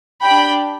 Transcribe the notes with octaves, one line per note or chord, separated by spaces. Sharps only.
D4 G4 G5 B5